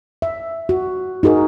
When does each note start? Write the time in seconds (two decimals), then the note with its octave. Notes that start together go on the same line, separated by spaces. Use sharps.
0.22 E5
0.69 F#4
1.23 D#4 F#4 G#4 A#4